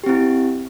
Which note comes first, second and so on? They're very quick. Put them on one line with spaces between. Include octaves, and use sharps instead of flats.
G4 C4 E4